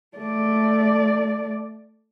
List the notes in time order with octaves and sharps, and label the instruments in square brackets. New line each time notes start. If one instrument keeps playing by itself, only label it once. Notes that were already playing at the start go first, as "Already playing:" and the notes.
[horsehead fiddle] A3 D5